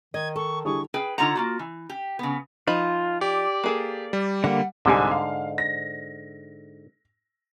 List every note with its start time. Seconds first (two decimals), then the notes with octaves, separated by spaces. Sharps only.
0.14 D#3 D#5 G#6
0.36 A4 C#6
0.65 D3 G3 E4 G#4 C#6
0.94 G#4 B4 G5
1.18 D3 D#4 F4 C#5 F#5 A#5
1.35 A#3 F4 F#4
1.59 E3
1.90 G4
2.19 C#3 B3
2.67 F3 D#4 F4 B5
3.21 G4 D5
3.64 A#3 G#4 A4
4.13 G3
4.44 D3 A#3 F#5
4.85 C2 G#2 D3 G3 G#5
5.11 F5
5.58 A#6